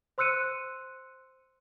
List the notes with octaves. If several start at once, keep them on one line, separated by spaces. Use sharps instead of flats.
C5 C6 E6 F#6 C#7 D#7